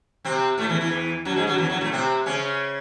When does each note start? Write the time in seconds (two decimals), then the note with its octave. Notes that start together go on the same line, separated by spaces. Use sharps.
0.25 C3 C4
0.58 A2 A3
0.69 E2 E3
0.81 E2 E3
1.25 F#2 F#3
1.36 G#2 G#3
1.47 F#2 F#3
1.58 E2 E3
1.69 F#2 F#3
1.81 A2 A3
1.92 C3 C4
2.26 C#3 C#4